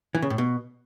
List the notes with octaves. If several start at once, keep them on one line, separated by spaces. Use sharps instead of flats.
E3
C#3
A2
B2